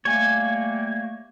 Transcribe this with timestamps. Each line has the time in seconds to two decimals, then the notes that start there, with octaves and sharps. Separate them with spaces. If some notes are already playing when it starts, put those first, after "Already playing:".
0.05 G3 A3 A#3 C#5 G#5